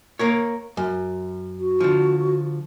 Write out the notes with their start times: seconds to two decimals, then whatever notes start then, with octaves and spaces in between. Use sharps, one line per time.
0.19 A#3 A#4 C#5
0.77 F#2
1.59 F#4
1.80 D3 F3